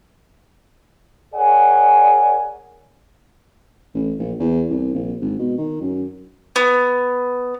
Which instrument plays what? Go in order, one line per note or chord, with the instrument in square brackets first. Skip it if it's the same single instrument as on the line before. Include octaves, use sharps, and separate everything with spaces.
[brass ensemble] G#4 A#4 C#5 D5 F#5 G#5
[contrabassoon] A1
A#1
E2
C2
A#1
G#1
B2
D#3
F#2
[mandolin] B3